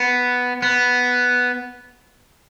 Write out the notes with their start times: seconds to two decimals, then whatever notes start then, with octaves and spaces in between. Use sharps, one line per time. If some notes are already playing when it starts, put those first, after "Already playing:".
Already playing: B3
0.62 B3